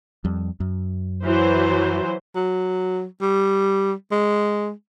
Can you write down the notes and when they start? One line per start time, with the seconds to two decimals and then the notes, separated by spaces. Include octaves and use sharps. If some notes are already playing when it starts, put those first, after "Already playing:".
0.25 F2 G3
0.60 F#2
1.24 E3 F#3 C5
2.35 F#3
3.22 G3
4.12 G#3